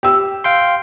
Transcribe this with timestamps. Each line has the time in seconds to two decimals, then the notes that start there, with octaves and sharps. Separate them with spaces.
0.03 G4 E6
0.44 F5 G5 C6